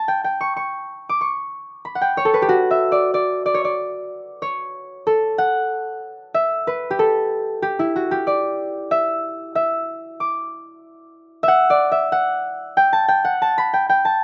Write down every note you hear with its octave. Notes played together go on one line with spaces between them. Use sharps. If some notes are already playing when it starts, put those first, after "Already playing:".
Already playing: A5
G5
G5
C#6
C#6
D6
C#6
B5
F#5
G5
C#5
A4
B4
G4
F#4
E5
D5
D5
D5
C#5
D5
C#5
A4
F#5
E5
B4
G4
A4
G4
E4
F#4
G4
D5
E5
E5
D6
E5 F#5
D5
E5
F#5
G5
A5
G5
F#5
A5
B5
G5
G5
A5